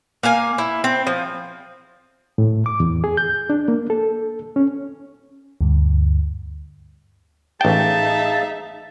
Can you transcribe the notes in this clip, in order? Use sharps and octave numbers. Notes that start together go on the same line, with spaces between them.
A#3 F5 G#5
E4
C4
F3
A2
D6
E2
G#4
G6
D4
A#3
A4
C#4
D2 G2
A1 D#4 G#4 E5 F5 G5 A5